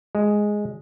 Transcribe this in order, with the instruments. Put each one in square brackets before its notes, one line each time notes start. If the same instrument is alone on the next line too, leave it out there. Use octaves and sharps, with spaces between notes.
[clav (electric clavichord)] G#3